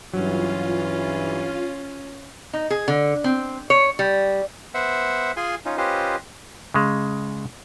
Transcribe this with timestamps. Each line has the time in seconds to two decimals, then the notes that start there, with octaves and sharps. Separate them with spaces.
0.14 G2 E3 F#3 C#4 F4
2.53 D#4
2.70 G#4
2.88 D3
3.24 C4
3.70 C#5
3.99 G3
4.74 B3 C5 E5 F#5
5.37 F4 G#4 G#5 C6
5.65 C#4 D#4 F4
5.77 C#4 F4 G4 B4 C5 D#5
6.74 C#3 G#3